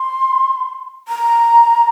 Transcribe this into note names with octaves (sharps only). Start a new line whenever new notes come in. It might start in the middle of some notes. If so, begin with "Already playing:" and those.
Already playing: C6
A#5